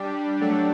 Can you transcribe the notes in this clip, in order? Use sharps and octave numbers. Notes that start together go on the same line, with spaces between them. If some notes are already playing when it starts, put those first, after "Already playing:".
Already playing: G3 D4 G4
F#3 A3 D4 A4